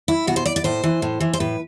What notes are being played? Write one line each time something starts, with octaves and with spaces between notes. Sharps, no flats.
E4
B2 F#4
C5
D5
D5
A2 C5
E3
A2
E3
C5
A2 B4